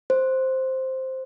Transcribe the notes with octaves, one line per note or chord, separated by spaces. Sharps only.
C5